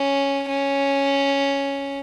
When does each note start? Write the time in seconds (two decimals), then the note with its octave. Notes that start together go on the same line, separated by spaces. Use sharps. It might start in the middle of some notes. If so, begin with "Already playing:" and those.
Already playing: C#4
0.48 C#4